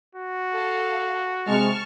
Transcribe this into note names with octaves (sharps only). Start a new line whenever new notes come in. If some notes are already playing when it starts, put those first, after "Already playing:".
F#4
A4 F5
C3 G#3 A5 C#6 F6